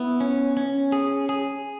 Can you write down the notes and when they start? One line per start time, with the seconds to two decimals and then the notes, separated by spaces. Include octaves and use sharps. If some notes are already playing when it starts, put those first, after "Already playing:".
Already playing: B3 E4
0.20 C#4
0.57 C#4
0.92 G#4
1.29 G#4